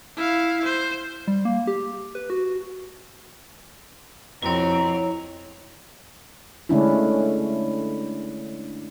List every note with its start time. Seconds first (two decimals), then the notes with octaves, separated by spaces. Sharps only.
0.17 E4 F5
0.64 C5
1.28 G3
1.45 A#3
1.67 G4
2.15 B4
2.30 F#4
4.43 F2 B2 C4 E4 C#5 A#5
6.69 D3 G#3 A3 C#4 D4 E4